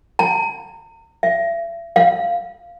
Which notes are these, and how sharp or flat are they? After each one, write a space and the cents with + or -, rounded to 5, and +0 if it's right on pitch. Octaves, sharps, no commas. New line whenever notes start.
A#5 -40
E5 +40
F5 -10